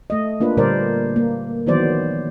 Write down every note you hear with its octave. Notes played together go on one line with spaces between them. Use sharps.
A3 D#5
A#3 D4 F4 B4
A#2 D3 G3 A#4 C5 D5
A#3
D#3 E3 F#3 B3 C5 D5